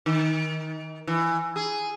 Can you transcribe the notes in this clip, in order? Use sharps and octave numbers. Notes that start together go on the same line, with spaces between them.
D#3
E3
G#4